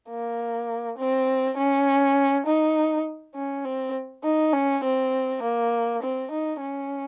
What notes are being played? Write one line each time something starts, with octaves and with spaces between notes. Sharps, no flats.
A#3
C4
C#4
D#4
C#4
C4
D#4
C#4
C4
A#3
C4
D#4
C#4